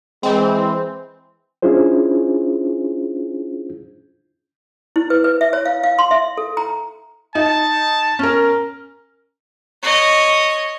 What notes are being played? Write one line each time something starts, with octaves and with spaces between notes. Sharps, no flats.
E3 G#3 C4
C#4 D4 E4 F4 G#4 C5
E4
B4
B4
E5
C#5
F5
F5
C6
E5
A4
A#5
D#4 A5
C#4 A#4
C#5 D#5